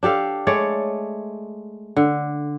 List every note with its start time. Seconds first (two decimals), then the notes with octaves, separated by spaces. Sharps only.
0.03 D4 G4 A4 F5
0.47 G#3 A3 C#5 D5
1.96 D3